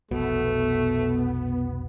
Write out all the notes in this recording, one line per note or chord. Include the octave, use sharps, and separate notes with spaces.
F1 B1 B2 A3 B3